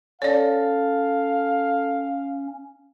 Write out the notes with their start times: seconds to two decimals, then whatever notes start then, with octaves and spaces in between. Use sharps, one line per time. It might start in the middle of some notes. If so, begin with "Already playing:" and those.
0.22 C#4 A4 C#5 D5 F5 A5